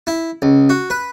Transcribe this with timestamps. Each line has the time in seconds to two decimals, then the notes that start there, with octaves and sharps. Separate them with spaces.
0.07 E4
0.42 C#2
0.69 F#4
0.90 B4